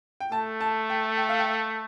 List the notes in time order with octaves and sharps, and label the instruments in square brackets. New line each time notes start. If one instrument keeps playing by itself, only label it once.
[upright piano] G5
[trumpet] A3 [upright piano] A5
[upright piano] A5
G5
G5
F5
G5